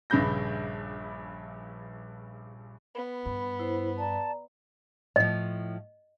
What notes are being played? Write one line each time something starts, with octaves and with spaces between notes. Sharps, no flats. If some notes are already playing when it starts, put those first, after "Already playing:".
A#1 G2 C#3 B5 G6 A#6
B3 B5
G2
E4 C5
D5 A5 A#5
A2 F3 D#5